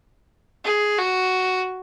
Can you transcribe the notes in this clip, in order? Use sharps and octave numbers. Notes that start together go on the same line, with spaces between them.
G#4
F#4